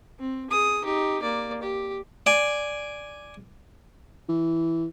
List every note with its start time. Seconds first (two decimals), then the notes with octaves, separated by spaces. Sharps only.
0.19 C4
0.50 G#4 D#6
0.84 D#4 G4
1.22 A#3 D5
1.62 G4
2.26 D5 G#5
4.29 E3